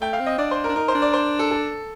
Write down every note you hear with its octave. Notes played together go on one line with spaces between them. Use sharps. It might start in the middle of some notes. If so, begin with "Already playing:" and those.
A3 G5
F5
C4
D#5
D4 D5
C5
A#4
D4
D#4 A#4
C5
D4
D5
C5
A4
A4